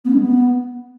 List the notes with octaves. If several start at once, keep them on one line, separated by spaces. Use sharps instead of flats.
B3
C#4
G#3
B3